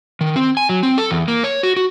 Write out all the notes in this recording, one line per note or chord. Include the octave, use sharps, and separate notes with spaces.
D#3
C4
G#5
F#3
C4
A4
E2
A#3
C#5
F#4
F#4